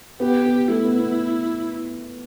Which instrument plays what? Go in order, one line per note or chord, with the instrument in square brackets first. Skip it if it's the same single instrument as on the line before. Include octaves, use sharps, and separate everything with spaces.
[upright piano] B3 [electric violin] G4
[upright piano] B3
[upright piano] A3 [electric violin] E4
[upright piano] B3
B3